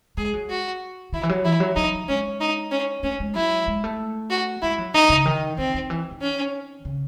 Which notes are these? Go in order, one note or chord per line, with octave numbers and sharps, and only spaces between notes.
G#3 G#4
F#3
F#4
D#3 E4
E3
F#3
E3 E4
F#3
F#3 D#4
G#3 C#4
D#4
C#4
A3 C#4
G#3
F#3 E4
G#3
A3
F#4
G#3 E4
F#3
D#3 D#4
C#3
D#3
D#3 C4
D#3
E3
D#3
C#4
C#3